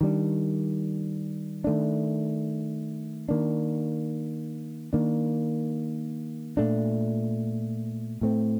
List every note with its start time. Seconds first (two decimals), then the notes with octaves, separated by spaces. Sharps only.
0.01 D#3 G3 D4
1.64 D#3 A3 D4
3.29 D#3 A#3 D4
4.93 D#3 A#3 D4
6.57 A#2 A3 D4
8.21 A2 A3 C4